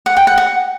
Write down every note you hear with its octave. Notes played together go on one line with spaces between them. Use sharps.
F#5
G5
F#5
F#5